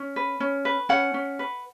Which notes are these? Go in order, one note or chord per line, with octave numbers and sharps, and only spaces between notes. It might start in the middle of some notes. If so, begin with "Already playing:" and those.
Already playing: C#4
B4
C#4
B4
C#4 F#5
C#4
B4